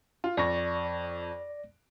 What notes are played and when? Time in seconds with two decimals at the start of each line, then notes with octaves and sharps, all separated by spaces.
0.24 F4
0.37 F2 D5 C#6 A#6